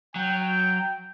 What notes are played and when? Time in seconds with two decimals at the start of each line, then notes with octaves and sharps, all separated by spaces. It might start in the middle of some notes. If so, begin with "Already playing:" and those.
0.15 F#3 G5